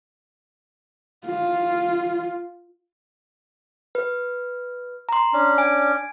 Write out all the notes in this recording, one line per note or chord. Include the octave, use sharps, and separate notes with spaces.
F4
B4
A#5 C6
C#4 D4
G#5